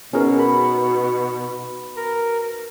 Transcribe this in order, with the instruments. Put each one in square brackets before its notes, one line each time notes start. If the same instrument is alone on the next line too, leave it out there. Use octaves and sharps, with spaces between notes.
[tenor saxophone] B2 [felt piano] B3 D#4 F#4 [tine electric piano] C#4 G#4 A#4
[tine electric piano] B5
[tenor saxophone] A#4